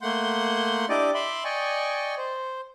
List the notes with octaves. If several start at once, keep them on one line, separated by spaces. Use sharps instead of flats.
A3 A#3 F#5 C6 G6
D4 E4 G4 D5 D#5 D6
E5 B5 C6 D6
D5 D#5 G5 G#5 C#6
C5